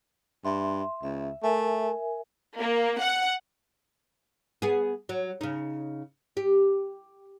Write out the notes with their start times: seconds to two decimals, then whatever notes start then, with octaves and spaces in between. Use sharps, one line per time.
0.45 G2 E5 C6
1.03 C#2 E5
1.43 A3 A#4 E5 G#5
2.57 A#3
2.99 F#5
4.62 B3 G#4
5.09 F#3
5.41 C#3 D#4
6.37 G4